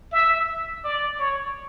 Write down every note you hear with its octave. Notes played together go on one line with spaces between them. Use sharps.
E5
D5
C#5